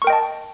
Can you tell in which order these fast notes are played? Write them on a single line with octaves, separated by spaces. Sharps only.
C#6 A#4 G5 D#5 A5